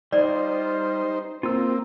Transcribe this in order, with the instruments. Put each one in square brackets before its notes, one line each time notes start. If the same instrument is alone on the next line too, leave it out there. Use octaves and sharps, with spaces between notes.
[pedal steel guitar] G3 F4 [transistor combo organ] D#4 C5 [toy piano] D5
[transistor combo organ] A#3 C4 [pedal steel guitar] F4 E6